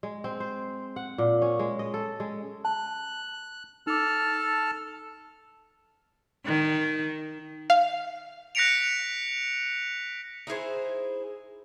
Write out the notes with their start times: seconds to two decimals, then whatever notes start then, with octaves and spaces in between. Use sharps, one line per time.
0.03 G#3
0.24 C4
0.40 C5
0.96 F#5
1.18 A#2
1.42 C#4
1.59 G#3
1.79 D#5
1.94 A4
2.20 G#3
2.65 A5 F#6
3.87 D#4 A4 A5 D6 F6
6.46 D#3
7.70 F5
8.55 F#6 A#6 B6 C#7 D7 F7
10.47 D#4 E4 G#4 C5